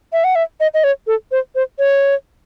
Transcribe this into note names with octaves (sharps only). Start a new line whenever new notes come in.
E5
F#5
E5
D#5
D#5
C#5
A4
C5
C5
C#5